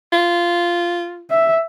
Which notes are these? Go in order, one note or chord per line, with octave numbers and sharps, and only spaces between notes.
F4
E5